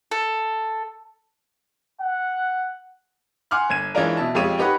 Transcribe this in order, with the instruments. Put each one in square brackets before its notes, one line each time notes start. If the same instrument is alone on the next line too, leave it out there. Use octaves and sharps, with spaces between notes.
[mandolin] A4
[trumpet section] F#5
[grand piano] F#5 G#5 C6 D6 F6 F#6
G1 G#6 D#7
E3 G#3 C#4 D4 F4 A#4
B2 E5 A5
F2 G#3 F4 G4 C#5 D#7
D#4 G4 B4 C#5 F#5